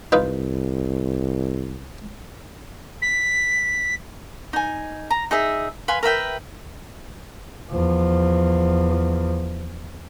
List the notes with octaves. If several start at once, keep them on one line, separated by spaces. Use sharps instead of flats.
C2 D#4 F4 B4
B6
D#4 G#5
A#5
D#4 G#4 E5
B4 F5 G#5 C6
A#4 B4 E5 G5
E2 F3